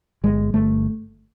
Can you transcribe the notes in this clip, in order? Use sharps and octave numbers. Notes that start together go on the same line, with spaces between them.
G1 G#3
G1 A3